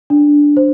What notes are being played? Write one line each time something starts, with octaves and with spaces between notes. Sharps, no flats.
D4
C5